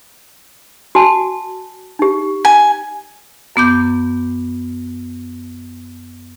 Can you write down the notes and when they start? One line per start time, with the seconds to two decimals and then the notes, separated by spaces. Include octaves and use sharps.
0.95 F#4 G#5 A5
1.99 D#4 G4
2.45 G#5
3.56 F#2 B3 D6 G6